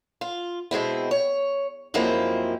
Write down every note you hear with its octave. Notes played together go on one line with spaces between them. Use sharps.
F4
B2 G#3 C4 E4
C#5
F#2 F3 G#3 A#3 C4 E4